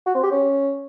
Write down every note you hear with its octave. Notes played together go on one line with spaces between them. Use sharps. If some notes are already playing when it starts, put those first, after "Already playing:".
F#4
C4
G4
C#4